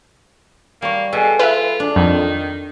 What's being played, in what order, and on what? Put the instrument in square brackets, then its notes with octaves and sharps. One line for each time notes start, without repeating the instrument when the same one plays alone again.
[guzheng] G3 C#5 [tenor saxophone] A#3
[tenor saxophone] B2 [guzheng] G#4 A4
[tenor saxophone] F4 [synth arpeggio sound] B4 E5
[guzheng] D4
[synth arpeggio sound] F2 [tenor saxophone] D#3